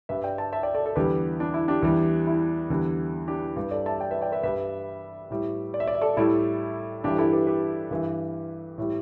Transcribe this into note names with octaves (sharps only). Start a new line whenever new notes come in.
G2 G3 B4 E5
D5 G5
E5 A5
E5 A5
D5 G5
A4 D5
A4 D5
E2 D3 G3 G4 B4
D4
E4
D4 G4
E2 E3 G3
E4
E2 D3 G3
D4 G4
G2 G3 G4 B4
A4 D5
E5 A5
D5 G5
B4 E5
D5 G5
B4 E5
G2 G3 B4 E5
A2 G3
D5
E5
D5
E5
A4 D5
A2 G3 E4 A4
G2 E3 G3 D4 G4
E4 A4
G4 B4
G4 B4
G2 E3 G3
A2 G3